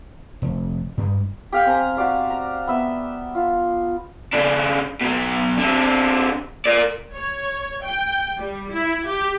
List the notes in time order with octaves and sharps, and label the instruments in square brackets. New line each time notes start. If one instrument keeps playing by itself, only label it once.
[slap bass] F1
G2 G3 G#3
[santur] G4 F5 G5
C4 G#5 A#5
F#4 G4 D5 F5
A#5
B3 E5
F4
[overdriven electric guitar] C#3 D4
B2 F#3
D3 C4
A#4 D5
[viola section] C#5
G5
G3
E4
G4